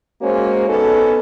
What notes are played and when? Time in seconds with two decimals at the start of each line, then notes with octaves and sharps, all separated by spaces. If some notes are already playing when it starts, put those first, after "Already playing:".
0.21 G#3 A#3 C#4 F#4 C5
0.68 B3 C#4 D#4 A4